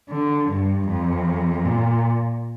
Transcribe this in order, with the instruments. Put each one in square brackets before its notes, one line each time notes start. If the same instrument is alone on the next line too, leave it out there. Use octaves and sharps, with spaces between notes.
[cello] D3
G2
F2
A#2